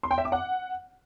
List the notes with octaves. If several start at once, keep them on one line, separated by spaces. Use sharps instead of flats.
C6
G5
E5
D6
F#5